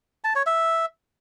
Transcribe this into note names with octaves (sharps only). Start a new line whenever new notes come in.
A5
C#5
E5